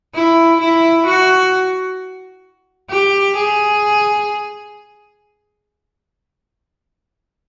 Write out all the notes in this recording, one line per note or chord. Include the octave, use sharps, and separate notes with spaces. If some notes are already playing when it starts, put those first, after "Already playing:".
E4
E4
F#4
G4
G#4